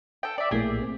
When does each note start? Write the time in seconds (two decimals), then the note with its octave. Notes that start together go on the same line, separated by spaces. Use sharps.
0.23 A4 G5
0.38 D5 E5
0.51 A#1 A2 A#3 G4 G#4
0.82 C4